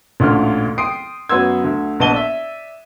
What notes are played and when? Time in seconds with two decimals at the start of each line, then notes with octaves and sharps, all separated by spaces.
0.20 A1 D2 A#2 F6
0.78 G5 C6 D#6 C7 D7
1.29 F#2 F#3 B3 C6 E6 G#6
1.64 D2
2.00 A#1 B3 D#5 A5 D#7 G7
2.13 D5 E5